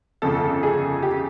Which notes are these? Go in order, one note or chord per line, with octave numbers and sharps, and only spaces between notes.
G1 F2 C#3 A4
G#4
G4